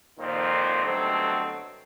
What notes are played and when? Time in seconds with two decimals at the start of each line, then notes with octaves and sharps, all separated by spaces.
0.19 G#1 F2 A#2 D#3 C5
0.84 B2 D3 F#3 G3 A3 C4